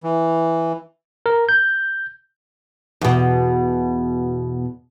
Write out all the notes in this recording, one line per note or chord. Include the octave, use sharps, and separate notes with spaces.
E3
A#4
G6
E2 B2